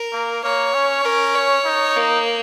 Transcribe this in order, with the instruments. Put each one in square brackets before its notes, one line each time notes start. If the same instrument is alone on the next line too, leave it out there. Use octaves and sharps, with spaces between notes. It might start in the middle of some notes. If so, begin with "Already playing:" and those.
Already playing: [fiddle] A#4
[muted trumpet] A#3
[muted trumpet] A#3 [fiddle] C#5
[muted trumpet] C#4
[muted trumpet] C#4 [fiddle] A#4
[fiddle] C#5
[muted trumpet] D#4
[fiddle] A#3